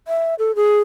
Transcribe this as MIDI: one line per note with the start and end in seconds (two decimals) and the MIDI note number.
0.08 0.35 76
0.39 0.55 69
0.56 0.80 68